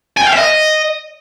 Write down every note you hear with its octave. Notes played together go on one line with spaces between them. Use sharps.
G#5
G5
F5
E5
D#5